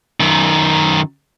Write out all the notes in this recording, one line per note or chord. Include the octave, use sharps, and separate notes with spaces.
F#2 D#3